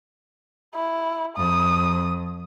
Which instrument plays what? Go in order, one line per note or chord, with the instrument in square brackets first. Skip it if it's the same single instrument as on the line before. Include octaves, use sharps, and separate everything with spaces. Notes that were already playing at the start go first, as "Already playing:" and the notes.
[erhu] E4
[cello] F2 [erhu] D#6